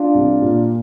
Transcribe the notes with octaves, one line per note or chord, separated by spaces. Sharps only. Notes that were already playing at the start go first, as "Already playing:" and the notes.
Already playing: D4 F4
C2
A#2